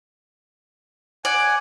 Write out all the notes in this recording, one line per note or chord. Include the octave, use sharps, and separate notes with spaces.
D5 F#5 G#5